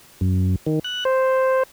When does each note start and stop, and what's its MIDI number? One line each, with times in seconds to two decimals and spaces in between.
0.21 0.56 42
0.66 0.79 51
0.84 1.04 90
1.05 1.63 72